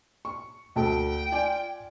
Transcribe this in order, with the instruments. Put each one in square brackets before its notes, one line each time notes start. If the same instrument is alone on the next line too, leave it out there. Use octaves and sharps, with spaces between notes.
[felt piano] C#6
[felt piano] D2 A4 A5 [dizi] G5
[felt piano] F4 D5 G#5